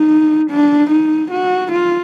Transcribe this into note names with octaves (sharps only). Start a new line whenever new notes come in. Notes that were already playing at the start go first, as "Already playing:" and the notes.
Already playing: D#4
D4
D#4
F#4
F4